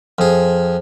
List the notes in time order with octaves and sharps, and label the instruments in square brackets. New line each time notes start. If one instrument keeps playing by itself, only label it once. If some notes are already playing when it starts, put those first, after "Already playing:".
[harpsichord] F2 G#4